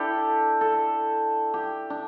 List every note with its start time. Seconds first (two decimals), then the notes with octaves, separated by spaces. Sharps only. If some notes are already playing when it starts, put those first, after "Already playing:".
Already playing: D4 E4 G4 A4
0.61 A4
1.54 G4
1.90 D4